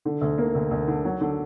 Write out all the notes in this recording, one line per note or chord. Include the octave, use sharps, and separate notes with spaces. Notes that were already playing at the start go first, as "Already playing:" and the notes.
D3
D2
A#3
D2
D2
D3
F#3
D3